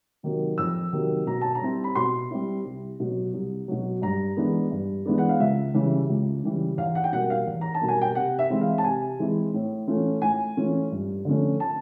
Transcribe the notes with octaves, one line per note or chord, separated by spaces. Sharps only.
C3 D#3 F#3 A#3
F2 E6
C3 D#3 F#3 A#3
B2 A#5
A5
A#5
G3 C4 E4
B5
B2 C6
G3 C4 E4
C2
B2 F#3
C2
B2 F#3
G2 A#5
E3 G#3 B3 D4
G2
E3 G#3 B3 D4
F#5
F5
C#2 E5
C#3 E3 G3
C#2
C#3 E3 G3
E2 F5
F#5
G5
B2 G3 A#3 F#5
F5
E2
A#5
A5
B2 G3 A#3
G#5
G5
C3 F#5
E5
E3 G#3 C4 E4
F5
A5
C3 G#5
E3 G#3 C4 E4
A2
E3 A3 C#4 F4
A2 G#5
E3 A3 C#4 F4
G2
D3 F3 A3 C#4
A5